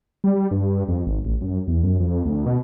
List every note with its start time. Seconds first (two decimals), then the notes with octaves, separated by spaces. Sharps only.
0.24 G3
0.51 G2
0.88 F2
1.07 G#1
1.25 A1
1.41 F#2
1.68 E2
1.83 F#2
2.00 F2
2.25 D2
2.46 B2